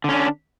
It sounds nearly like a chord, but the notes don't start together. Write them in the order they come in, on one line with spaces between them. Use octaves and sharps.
D3 C#4 D4